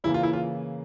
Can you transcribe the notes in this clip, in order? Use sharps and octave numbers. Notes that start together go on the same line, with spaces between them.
C#3 E3 A#3 E4
F4
E4
F4